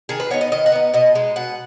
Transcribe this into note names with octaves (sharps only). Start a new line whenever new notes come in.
D#3 G#4
B4
B3 D#4 C#5
D#5
D#3 D#5
F#5
B3 D#4
B2 D#5
G#3 D#4
B2 F#5